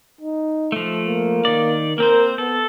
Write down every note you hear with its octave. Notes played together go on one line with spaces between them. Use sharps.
D#4
F3 A3
A#3
D#3 D5
A#3 C4 A#4 C5
B3 A4